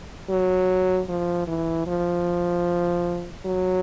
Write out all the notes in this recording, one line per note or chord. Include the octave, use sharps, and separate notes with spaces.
F#3
F3
E3
F3
F#3